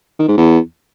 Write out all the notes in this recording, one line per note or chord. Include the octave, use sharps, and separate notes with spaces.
D#3
G#2
E2